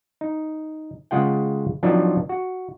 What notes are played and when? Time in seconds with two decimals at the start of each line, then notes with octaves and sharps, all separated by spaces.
0.21 D#4
1.11 C#3 G#3 F4 F#5 G5
1.83 F3 F#3 C4 D4 D#4
2.29 F#4